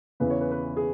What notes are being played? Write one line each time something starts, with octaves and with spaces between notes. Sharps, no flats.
E2 C#3 E3 B4
C#5
B4
B4
G#4